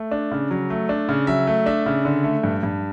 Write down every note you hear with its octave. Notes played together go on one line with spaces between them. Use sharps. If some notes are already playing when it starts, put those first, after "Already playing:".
Already playing: A3
D4
C#3
F#3
A3
D4
C#3
F#3 E5
A3
D4 E5
C#3
D3
A3
G2
G2